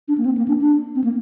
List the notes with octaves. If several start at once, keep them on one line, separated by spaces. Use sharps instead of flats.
D4
A#3
C4
A#3
D4
D4
C4
A#3